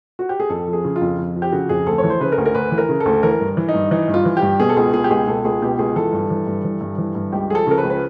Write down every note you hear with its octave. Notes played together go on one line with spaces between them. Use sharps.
F#4
G4
G#4
F2 A4
F3
G#4
C#3
F4
F2
F2
F3
G4
C#3 F#4
F2 G#4
D2 A4
C#5
E3
C5
C#3 B4
A#4
D2
A#4
D2 B4
E3
A#4
C#3
A4
D2
E3 A#4
G2
E3
D#4
G2
E3 D#4
G2
F4
E3
G4
G2
B2 G#4
A4
C#2 G#4
B2 G#4
G4
C#2 G#4
B2 A4
C#2 G#4
B2 G4
C#2 G#4
E3 A4
G2
E3
G2
E3
G2
E3
G2
C#2 G4
F3 G#4
A4
C#3 A#4
B4
C#2
B4